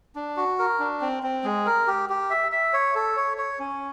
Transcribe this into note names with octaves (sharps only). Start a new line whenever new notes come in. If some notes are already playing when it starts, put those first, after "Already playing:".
D4
F#4
A#4
D4
C4
C4
G#3
A#4
G4
G4
E5
E5
C#5
A4
C#5
C#5
C#4